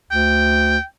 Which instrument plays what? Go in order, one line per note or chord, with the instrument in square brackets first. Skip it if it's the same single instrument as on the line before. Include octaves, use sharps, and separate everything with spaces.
[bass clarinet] D2 [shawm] G5